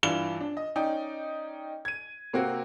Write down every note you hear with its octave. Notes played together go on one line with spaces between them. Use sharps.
G2 E3 F4 D5 E7 G7
D4
D#5
C#4 D#4 D5 G5
G#6 D#7
C3 A#3 C4 F#4